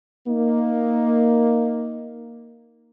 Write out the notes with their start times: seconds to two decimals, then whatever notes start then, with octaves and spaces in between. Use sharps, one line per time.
0.27 A#3 D#4